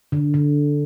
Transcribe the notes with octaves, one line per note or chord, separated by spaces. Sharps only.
D3
D3